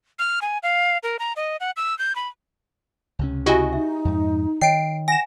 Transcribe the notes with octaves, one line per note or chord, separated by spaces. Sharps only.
F6
G#5
F5
A#4
A#5
D#5
F#5
E6
G6
B5
C#2 C3 C#4
E4 F#4 G4 D#5 G#5
D#4 E5
F2 G#2
D#3 C#5 D#5 G5 C7 D7
F#5 G#5 A#6 E7